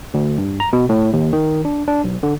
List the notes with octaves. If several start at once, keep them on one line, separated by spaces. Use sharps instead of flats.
D2
G2
A#5
B2
A2
D#2
D#3
D4
D4
B1
D3